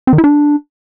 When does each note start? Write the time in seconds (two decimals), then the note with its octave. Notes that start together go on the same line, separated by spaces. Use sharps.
0.07 C4
0.13 D#3
0.18 E4
0.24 D4